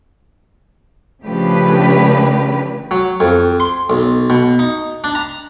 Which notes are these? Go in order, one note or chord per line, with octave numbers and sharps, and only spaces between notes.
C#3 F3 A3 D4 G4 B4
F#3
F2
C6
B1
B2
D#4
D4
A#5